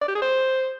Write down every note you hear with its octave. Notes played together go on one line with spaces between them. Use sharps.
D5
G4
G#4
C5